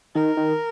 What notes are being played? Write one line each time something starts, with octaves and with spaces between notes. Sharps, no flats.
D#3 A#4
D#3